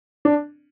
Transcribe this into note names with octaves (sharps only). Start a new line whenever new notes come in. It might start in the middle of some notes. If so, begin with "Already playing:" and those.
D4